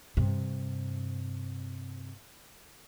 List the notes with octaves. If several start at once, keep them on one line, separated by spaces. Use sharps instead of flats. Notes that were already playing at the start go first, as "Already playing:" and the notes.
G2 C3